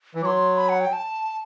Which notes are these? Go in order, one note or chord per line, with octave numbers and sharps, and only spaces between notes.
E3
F#3 C6 D6
B5
F#5
G5
A5